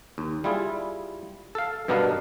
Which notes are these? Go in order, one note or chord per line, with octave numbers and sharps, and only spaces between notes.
D#2
G3 E4 F4 G#4
A4 F5
G2 B2 B3 D4 A#4 F5